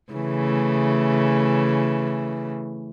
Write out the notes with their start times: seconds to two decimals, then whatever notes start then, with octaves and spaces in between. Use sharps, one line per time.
0.13 C#3 E3 A3